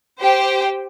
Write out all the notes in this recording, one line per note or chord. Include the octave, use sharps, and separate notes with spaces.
G4 C5 G5